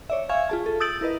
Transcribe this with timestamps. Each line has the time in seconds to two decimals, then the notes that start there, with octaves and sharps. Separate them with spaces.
0.10 C#5 D5 E5
0.29 E5 F5 G#5 C#6 G#6
0.49 F4 G#4 A5
0.66 A4
0.80 D#6 E6 G6 A6 D7 F#7
1.01 E4 A#4 B4 D#5